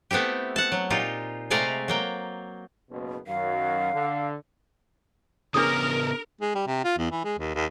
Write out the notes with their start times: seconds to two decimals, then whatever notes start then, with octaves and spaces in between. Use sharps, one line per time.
0.11 A3 B3 C4 E4 G4
0.56 F#5 A5
0.72 F#3
0.90 A#2 D#4 F4 G4
1.50 C3 G#3 A3 D5 F5 A#5
1.88 F#3 A#3 G5
2.90 F#1 B2
3.27 F#2 D#3 F#3 F5
3.93 D3
5.54 C#3 B3 C#4 D4 G#4 A#4 D#6
6.41 G#3
6.55 G3
6.67 C3
6.84 F4
6.98 E2
7.11 E3
7.24 G#3
7.39 D#2
7.55 D#2